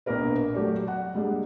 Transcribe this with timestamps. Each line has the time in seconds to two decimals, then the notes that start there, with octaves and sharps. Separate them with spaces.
0.06 A#1 B2 A#3 A#4 B4
0.54 F#3 A3 G4 D5
0.88 F#5
1.14 G3 G#3 A#3 D4